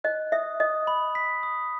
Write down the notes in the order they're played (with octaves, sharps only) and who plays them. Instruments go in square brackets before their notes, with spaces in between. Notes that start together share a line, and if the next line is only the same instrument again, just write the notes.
[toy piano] D#5 [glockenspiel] F#6
[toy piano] E5 [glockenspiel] D#6
[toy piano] D#5 [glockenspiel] D#6
[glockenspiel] B5
B6
D#6